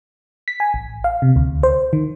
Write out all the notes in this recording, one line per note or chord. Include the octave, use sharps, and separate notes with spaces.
B6
G#5
A1
F5
C3
D2
C5
D#3